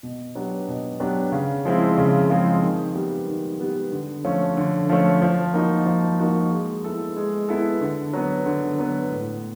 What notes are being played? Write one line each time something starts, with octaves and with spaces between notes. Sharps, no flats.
B2
F#3 B3 D4 G4
B2
F#3 B3 D4 G4
C#3
F3 G#3 C4 E4
C#3
F3 G#3 C4 E4
D#3
G3 B3
D#3
G3 B3
D3
F3 A3 C#4
D3
F3 A3 C#4
F3
A#3 D#4 F#4
F3
A#3 D#4 F#4
G#3
B3 E4 A4
G#3
B3 E4 A4
D3
F#3 B3
D3
F#3 B3
A2